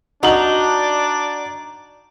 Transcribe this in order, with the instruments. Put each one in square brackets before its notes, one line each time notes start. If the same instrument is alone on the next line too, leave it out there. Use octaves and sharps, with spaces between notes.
[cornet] D4 [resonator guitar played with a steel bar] D#4 [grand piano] F#4 F#7 [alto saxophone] D5